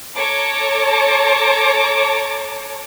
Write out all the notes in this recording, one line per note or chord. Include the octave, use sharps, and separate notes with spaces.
A4 C#5 A5 A#5 D6